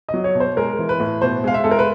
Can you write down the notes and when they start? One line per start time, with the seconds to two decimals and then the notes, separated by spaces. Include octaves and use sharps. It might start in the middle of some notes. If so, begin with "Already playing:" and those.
0.09 D#5
0.14 F#3
0.24 C#5
0.35 B2
0.40 C5
0.57 G#3 A#4
0.79 E3
0.89 B4
1.00 A2
1.22 B2 C5
1.44 G#3 F5
1.54 E5
1.64 G#3 A4
1.71 A#4
1.79 B4